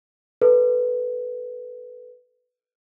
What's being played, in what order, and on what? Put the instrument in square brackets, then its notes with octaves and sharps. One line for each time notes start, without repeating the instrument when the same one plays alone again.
[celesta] A4 B4